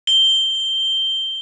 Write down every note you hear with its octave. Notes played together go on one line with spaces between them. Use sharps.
G7